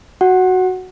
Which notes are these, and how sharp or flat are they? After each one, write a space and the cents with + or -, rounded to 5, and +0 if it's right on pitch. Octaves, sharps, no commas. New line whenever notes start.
F#4 +0 F#5 +0